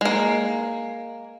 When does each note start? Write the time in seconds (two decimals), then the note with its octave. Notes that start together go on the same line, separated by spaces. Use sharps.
0.01 G#3 A#3